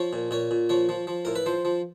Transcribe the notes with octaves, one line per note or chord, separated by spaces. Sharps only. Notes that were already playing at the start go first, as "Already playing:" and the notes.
Already playing: F3 C#5
A#2
A#2 C#5
A#2
F3 C#5
F3
F3
A2 A#4
B4
F3 C5
F3